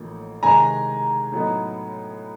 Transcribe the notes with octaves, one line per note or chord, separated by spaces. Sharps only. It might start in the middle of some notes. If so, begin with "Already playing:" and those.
Already playing: A1 A2 F3 A#3 D#4
C3 D#3 G#3 C4 G#5 A#5
A2 F#3 B3 D#4